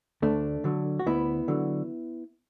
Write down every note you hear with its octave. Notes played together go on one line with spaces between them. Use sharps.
D2 A3 D4
D3 F#3
F#4
D2 B3 E4
D3 F#3